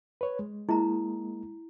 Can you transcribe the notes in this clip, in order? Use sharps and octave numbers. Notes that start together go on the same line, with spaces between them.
B4 C#5
G#3
G#3 A#3 E4 A#5